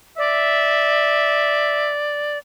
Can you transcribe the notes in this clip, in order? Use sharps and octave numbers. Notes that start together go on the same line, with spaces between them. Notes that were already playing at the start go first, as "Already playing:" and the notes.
D5 E5